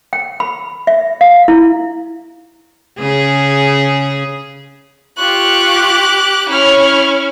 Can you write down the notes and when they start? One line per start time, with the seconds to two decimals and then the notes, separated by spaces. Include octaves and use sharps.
0.13 G5
0.40 B5
0.87 E5
1.21 F5
1.48 E4
2.99 C#3 G#4
5.18 F4 G4 C#6 F#6
6.49 C#4 E4 C#5 F6